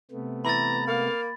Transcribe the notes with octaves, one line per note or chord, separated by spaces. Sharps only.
C3 A3 B3
E3 A#5 B5 A6
A#3 F5